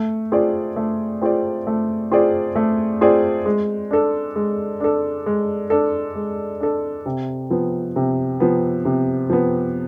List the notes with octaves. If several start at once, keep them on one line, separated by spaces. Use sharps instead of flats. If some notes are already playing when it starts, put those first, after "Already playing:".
Already playing: A3
C4 F4 G#4 D5
A3
C4 F4 G#4 D5
A3
C4 F4 G#4 D5
A3
C4 F4 G#4 D5
G#3
D4 A4
G#3
D4 A4
G#3
D4 A4
G#3
D4 A4
C3
F3 B3
C3
F3 B3
C3
F3 B3